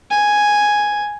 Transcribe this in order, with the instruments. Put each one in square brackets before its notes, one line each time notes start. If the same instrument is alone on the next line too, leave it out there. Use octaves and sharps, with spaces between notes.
[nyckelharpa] G#5